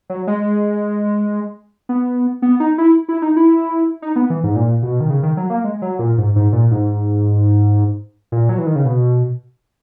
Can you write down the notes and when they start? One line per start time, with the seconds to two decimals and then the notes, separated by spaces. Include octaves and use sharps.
0.10 F#3
0.27 G#3
1.89 B3
2.42 B3
2.60 D#4
2.78 E4
3.09 E4
3.22 D#4
3.36 E4
4.02 D#4
4.16 B3
4.30 E3
4.44 G#2
4.56 A#2
4.83 B2
5.00 D#3
5.10 C#3
5.23 D#3
5.37 F#3
5.50 A#3
5.64 G#3
5.82 F#3
5.99 A#2
6.18 G#2
6.36 G#2
6.53 A#2
6.71 G#2
8.32 A#2
8.49 F#3
8.58 E3
8.66 D#3
8.76 C#3
8.85 B2